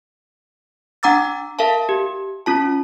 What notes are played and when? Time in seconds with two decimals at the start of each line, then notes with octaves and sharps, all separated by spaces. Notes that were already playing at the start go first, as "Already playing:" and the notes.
1.03 D4 F#5 A#5 D6 E6 A6
1.59 A#4 E5 F5 A5
1.89 G4
2.46 C#4 F4 A5